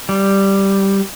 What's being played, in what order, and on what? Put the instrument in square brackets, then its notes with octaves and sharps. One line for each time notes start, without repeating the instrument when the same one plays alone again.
[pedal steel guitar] G3